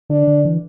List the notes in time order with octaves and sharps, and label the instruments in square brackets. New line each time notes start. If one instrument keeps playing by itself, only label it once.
[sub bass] D3 [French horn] D4
[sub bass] D3
E3